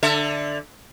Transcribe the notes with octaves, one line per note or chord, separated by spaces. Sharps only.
D3 A4 E5